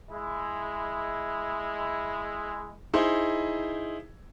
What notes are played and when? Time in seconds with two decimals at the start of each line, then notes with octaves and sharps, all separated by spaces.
0.11 G#3 E4
2.94 D#4 E4 G#4 C5